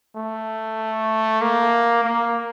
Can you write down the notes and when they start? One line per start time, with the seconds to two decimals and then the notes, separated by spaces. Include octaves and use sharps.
0.16 A3
1.42 A#3
2.04 A#3